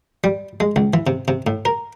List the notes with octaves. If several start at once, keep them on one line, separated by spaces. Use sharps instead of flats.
G3
G#3
C#2
E3
C3
C3
A2
A#4